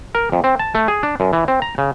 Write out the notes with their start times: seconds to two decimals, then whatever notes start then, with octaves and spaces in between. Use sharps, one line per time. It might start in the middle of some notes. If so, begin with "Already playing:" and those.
0.15 A#4
0.32 F2
0.44 C4
0.59 A5
0.75 A3
0.88 G#4
1.03 D4
1.20 F#2
1.33 E3
1.48 C4
1.62 A#5
1.78 C#3